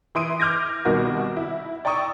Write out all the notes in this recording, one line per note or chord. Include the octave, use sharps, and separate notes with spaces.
E3 E4 C6 D#6 D7 D#7
D6 F6 G6 G#6 A#6
C2 B2 D#3 F#4 A#4 D6
E4
D5 G5 A#5 C#6 D#6 E6